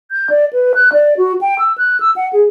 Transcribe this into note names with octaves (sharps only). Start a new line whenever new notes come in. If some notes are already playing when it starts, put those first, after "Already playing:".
G6
D5
B4
F#6
D5
F#4
G5
E6
F#6
E6
F#5
G#4